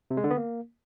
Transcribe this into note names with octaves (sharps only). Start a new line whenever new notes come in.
C3
G#3
D3
B3
A#3